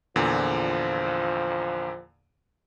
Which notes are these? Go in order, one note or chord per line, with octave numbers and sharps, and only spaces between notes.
E2 A#2 D3 F3